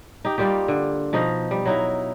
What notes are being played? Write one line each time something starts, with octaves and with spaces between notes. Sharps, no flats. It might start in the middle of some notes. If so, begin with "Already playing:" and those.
D#4 G4
G3 A#3 F4 G4
D3
B2 F3 D#4 D#5
G3
F#3 D#4 E4